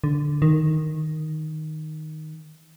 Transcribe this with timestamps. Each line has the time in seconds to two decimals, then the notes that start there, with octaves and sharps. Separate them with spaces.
0.04 D3
0.42 D#3